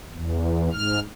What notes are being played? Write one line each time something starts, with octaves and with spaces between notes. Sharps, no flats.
E2
G#2 F6